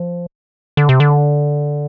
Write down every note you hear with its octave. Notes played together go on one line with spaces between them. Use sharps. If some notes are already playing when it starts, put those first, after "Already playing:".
Already playing: F3
D3
C3
D3